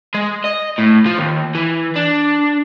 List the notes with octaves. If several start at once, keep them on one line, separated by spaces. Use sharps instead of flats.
G#3
D#5
A2
F3
D#2
E3
D4